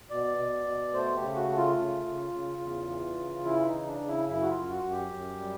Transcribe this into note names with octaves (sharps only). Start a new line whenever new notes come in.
B2 D5
B2
B2
A3 C5
G4
C#3
F#4
A3
F4
C#3
C#3
C#3
E2
E3
C#3
E3 E4
D#4
C#3
D4
C#3
E4
F#2 E4
F#4
F4
F#2
F#4
F#2
G4
F#2
G3